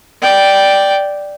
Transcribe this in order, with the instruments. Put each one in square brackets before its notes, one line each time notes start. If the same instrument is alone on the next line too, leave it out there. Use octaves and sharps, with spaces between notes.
[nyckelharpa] D5 G5